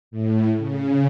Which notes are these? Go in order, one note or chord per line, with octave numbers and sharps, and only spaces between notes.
A2
C#3